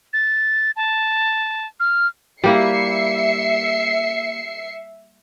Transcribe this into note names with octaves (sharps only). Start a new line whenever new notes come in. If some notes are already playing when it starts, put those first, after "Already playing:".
A6
A5
F6
G3 A#3 E4 E5 C7 C#7